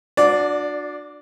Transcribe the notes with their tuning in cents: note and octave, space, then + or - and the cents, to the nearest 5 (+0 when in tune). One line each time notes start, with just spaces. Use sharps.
D4 +20 F#4 -30 D5 -10